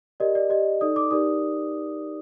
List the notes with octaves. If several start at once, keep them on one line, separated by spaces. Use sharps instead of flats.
G4 A#4 D5 D#5
D5
G4 D5 D#5
D#4 A4 D5 D#6
D6
D#4 G4 A#4 D5 D#6